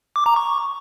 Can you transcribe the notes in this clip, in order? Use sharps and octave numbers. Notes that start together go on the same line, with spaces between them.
D6
A#5
C#6